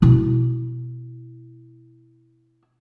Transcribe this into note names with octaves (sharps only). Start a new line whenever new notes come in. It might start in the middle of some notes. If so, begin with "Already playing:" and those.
B2 E4